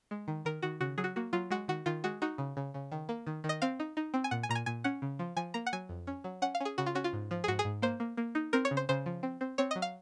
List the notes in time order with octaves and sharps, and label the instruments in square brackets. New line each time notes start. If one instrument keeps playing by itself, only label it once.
[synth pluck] G#3
D#3
D#3 A#4
D#3 F#4
C#3 F#4
F#3 G#4
F#4
A#3 F#4
F#3 F4
G#3 F#4
D#3 F#4
D#3 F4
G#3 F#4
D#4 F#4
C#3
C#3
C#3
D#3
A#3
D#3
D#3
D#5
C4 F5
D#4
D#4
C4
G#5
A#2 F#5
G#5
A#2 A#5
G#5
A#2 G#5
C#4 F#5
C#3
F3
F3 G#5
A#3 A#5
F#5
F#3 G#5
F2
C#4
F#3
C#4 F#5
F5
C#4 G#4
C#3 F#4
F4
C#4 F#4
F4
G#2
F3
G#4
G#2 F#4
G#4
G#2
A#3 C5
A#3
A#3
D#4
C4 A#4
C#5
C#3
C5
C#3 C5
F3
C4
C4
C4 C#5
F#3 D#5
F5